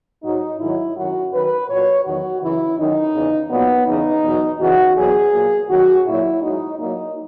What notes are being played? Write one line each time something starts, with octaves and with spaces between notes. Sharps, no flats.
G#2 F#3 D#4
G#2 D#3 F#3 E4
F#2 D#3 F#3 F#4
F#2 D#3 F#3 B4
A#2 F#3 C#5
E2 D#3 F#3 F#4
F#2 C#3 E3 E4
F#2 D#3 F#3 D#4
E2 C#3 E3
A#2 F#3 B3
E2 C#3 E3 D#4
E2 B2 F#3
E2 C#3 E3 F#4
E2 B2 F#3 G#4
A#2 F#3
F#2 D#3 F#3 F#4
A#2 F#3 E4
G#2 F#3 D#4
A#2 F#3 D#4